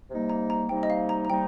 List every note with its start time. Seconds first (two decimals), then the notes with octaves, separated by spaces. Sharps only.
0.10 C3 G3 A#3 D#4
0.30 A#5
0.50 A#5
0.69 C3 G3 A#3 D#4 G5
0.83 D#5
0.90 F5
1.09 A#5
1.25 A#5
1.29 C3 G3 A#3 D#4 G5